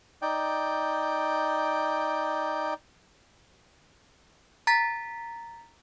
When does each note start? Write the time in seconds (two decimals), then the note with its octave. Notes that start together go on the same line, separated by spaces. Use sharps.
0.22 D#4 D5 G5
4.67 A#5 A6 B6